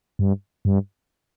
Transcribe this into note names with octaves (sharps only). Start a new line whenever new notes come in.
G2
G2